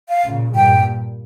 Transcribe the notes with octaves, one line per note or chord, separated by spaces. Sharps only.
F5
A#2 C#3
G2 A#2 G5